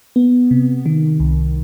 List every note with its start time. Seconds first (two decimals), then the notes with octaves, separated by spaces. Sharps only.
0.16 B3
0.51 C3
0.86 D#3
1.20 C2